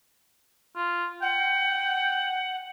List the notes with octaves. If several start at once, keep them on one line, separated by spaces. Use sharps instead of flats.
F4
F#5 G5